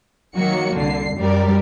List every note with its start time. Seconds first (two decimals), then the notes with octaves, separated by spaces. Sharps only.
0.36 D#3 F#3 A#3 F#4 C#7
0.77 C2 D3 C7
1.17 F#2 G3 A#4 D5